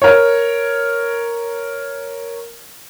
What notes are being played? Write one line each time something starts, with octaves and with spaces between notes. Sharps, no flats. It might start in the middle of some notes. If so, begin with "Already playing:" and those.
A#4 C#5